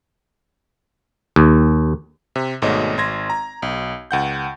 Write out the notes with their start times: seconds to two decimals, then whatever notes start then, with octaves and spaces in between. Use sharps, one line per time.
1.36 D#2
2.36 C3
2.62 G#1 G#2 B2 A3 C#5 D#5
2.98 G#1 C6 G#6 A#6
3.30 A#5
3.62 B1
4.11 C#2 F#5 G6